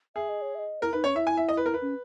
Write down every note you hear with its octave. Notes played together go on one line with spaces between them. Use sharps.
G#4 E5
D#5
C#5
E5
D#5
E4 A#4
D#4 B4
C#4 C#5
E4 E5
G#5
E5
D#5
B4
A#4
B4
C#4